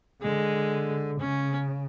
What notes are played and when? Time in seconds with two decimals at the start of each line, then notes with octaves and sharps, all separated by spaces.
0.22 D3 G#3
1.21 C#3 C#4